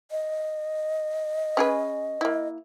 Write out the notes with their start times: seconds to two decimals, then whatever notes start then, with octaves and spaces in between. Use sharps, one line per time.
0.11 D#5
1.57 C#4 G#4 B4
2.21 A#3 E4